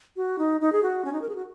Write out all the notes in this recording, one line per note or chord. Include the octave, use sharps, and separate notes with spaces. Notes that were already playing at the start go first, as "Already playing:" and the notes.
F#4
D#4
D#4
G#4
F#4
C#4
D#4
A#4
G#4
F#4